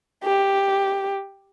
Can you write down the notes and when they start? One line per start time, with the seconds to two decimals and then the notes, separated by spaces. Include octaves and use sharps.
0.24 G4